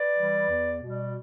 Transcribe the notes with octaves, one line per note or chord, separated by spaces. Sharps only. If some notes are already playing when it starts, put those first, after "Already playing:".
Already playing: B4 D5
E3 G3
E2
B2 G3